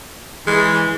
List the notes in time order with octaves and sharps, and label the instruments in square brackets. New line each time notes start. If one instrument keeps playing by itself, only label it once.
[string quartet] E3 [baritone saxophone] G#3